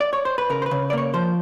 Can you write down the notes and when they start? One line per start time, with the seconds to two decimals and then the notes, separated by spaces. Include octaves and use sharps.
0.00 D5
0.13 C#5
0.25 C5
0.38 B4
0.50 C#3 A#4
0.62 C5
0.66 B4
0.71 C#3
0.90 D5
0.93 A#3 C#5
1.14 F3 C5